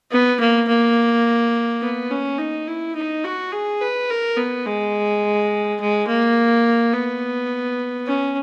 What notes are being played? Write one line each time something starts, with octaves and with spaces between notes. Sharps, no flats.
B3
A#3
A#3
B3
C#4
D#4
E4
D#4
F#4
G#4
B4
A#4
B3
G#3
G#3
A#3
B3
C#4